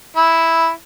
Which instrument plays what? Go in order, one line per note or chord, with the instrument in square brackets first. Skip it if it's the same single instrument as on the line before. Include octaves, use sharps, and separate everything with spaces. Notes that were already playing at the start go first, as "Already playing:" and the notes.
[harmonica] E4